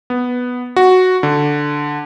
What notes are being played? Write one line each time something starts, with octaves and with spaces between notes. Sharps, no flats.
B3
F#4
D3